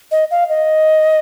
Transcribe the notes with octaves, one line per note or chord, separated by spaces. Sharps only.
D#5
F5
D#5